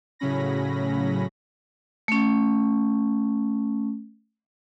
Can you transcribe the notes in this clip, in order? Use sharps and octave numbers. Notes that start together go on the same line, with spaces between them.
A2 C#3 F#3 C#4 B5 A#6
A3 C#4